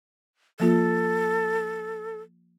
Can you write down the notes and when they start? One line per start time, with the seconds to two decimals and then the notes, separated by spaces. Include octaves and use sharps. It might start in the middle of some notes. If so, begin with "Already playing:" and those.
0.60 F3 A#3 F4 A4